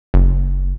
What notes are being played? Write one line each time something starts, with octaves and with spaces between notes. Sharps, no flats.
F#1